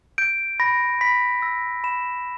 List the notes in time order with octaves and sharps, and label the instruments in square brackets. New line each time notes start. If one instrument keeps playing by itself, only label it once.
[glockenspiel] G6 D7
B5 A#6
B5 B6
E6 A#6
B5 E7